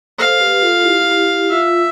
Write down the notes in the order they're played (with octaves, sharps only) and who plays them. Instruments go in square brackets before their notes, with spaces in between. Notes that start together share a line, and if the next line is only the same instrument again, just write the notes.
[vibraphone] A4 C5 [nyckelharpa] F5
[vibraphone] G4 B4
F4 A4
E4 G4
E4 G4
[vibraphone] F4 [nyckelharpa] E5